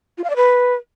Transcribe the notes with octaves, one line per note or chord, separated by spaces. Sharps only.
F4
F5
D5
B4